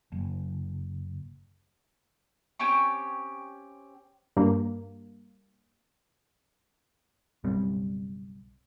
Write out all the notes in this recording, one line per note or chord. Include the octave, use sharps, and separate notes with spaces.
F#1
C4 C#4 G4 C#6
G2 A#3
F#1 B1 G3 C4